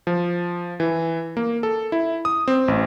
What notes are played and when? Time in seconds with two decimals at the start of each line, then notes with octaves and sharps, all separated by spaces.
0.07 F3
0.80 E3
1.37 A#3
1.63 A4
1.92 E4
2.25 D#6
2.48 C4
2.68 A1